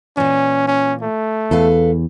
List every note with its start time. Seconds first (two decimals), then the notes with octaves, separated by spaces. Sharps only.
0.17 A#2 E3 C#4
0.68 C#4
1.02 A3
1.51 E2 A4 B4 F5